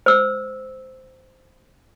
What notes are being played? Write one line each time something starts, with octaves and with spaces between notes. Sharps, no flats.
C5 E6